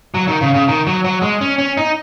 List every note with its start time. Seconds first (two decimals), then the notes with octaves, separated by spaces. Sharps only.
0.14 F#3
0.28 D#3
0.41 C#3
0.54 C#3
0.68 D#3
0.87 F#3
1.04 F#3
1.22 G#3
1.41 C#4
1.58 C#4
1.77 D#4